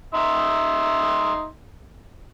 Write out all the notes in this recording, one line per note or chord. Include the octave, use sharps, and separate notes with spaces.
D#4 E5 C6